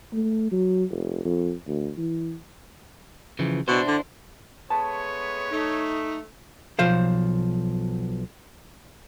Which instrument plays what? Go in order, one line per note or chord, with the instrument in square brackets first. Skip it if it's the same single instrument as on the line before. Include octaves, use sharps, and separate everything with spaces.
[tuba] A3
F#3
F1
F2
D2
E3
[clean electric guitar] C#3 E3 F3
[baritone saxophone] B2 [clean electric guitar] D4 E4 C5
[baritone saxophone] D3
[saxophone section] G#3 A3 B3 [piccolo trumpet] C#5 [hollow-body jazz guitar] A5
[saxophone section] A3 [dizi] D#4
[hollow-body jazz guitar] B1 F3 C5 F5